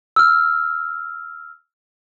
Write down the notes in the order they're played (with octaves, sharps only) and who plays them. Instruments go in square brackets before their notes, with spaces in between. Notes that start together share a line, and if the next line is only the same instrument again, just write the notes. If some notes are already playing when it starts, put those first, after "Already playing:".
[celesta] E6 F6